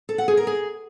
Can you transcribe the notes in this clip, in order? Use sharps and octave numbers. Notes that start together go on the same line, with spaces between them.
A4
F#5
G#4
A#4
G#4